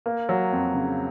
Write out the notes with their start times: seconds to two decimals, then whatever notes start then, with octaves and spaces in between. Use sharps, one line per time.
0.06 A#3
0.29 F#3
0.52 F2
0.74 C#3